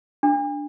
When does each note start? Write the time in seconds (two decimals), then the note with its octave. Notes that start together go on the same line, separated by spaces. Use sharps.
0.23 D4